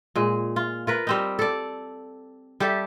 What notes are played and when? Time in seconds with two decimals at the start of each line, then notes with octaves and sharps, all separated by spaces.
0.15 A#2 G#3
0.56 F4
0.87 F4 A#4 B4
1.07 G3 C4 D#4
1.39 A4 D5
2.60 G3 G4 A4 E5